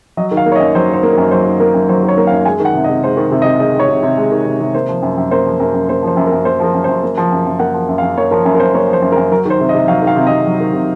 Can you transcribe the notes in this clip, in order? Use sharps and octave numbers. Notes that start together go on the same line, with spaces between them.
F#3 D#5
D#3
F5
A#3
C#5
D#5
F#2
F#3 C5
D#3 C5
A#3
A#4
F#2
F#3 C5
D#3
A#3 A#4
F#2
F#3 C5
D#3
C#5
A#3
F5
F#2
G#3 G#5
D#3
F#5
C3
D#5
C3
G#3 C5
D#3
C3
D#5
C3
G#3 D#5
D#3 C#5
C3
C3
G#3
D#3
C3
C3
A#3 C5
F3
F#2
F#2
A#3 C5
F3
F#2 A#4
F#2
A#3 C5
F3 C5
F#2
A#4
F#2
A#3 C5
F3 A#4
F#2
F#2 C5
A#3
F3
F#2
F#2
A#3 F#5
F3
F#2
F5
F#2
A#3 C#5
F3 A#4
F#2
A#4
F#2 C5
A#3 C#5
F3 C5
F#2
A#4
F#2
F#3 A#4
D#3 C5
C3
D#5
C3
F#3 F5
D#3 F5
C3
C3 D#5
F#3
D#3
C3